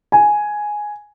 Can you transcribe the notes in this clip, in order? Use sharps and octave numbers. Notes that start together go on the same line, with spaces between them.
G#5